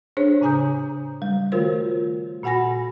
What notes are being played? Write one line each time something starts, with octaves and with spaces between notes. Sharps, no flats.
D4 G#4 C5 C#5
A2 C#3 G#5 A#5 D#6 G6
G3
D#3 A3 F4 F#4 A#4 C5
A#2 F#4 F#5 G#5 B5 A#6